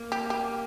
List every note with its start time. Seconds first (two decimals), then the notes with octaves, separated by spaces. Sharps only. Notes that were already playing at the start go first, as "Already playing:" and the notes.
Already playing: A#3
0.12 G4
0.30 G4